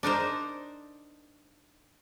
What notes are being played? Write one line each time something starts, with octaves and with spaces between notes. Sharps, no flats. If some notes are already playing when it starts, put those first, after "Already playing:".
D4 D#4 A#4 C5